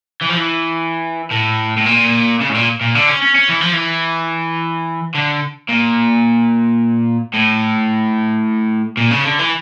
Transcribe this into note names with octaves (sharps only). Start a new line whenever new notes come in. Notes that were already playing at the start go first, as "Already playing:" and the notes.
E3
F3
E3
A2
A2
A#2
C#3
A2
A#2
A#2
D3
C#4
C#4
C#4
E3
F3
E3
D3
A#2
A2
A#2
C#3
D3
E3